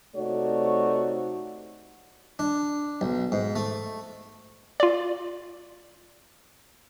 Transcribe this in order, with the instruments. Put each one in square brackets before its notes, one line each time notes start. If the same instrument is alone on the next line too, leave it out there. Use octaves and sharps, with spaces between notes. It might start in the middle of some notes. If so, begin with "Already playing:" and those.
[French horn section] C3 A3 D#4 F#4 C#5 D5
[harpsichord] D4
B1
G#2
A3
[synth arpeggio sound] F4 D5